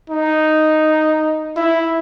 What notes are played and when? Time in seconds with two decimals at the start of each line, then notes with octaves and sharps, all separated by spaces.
0.10 D#4
1.57 E4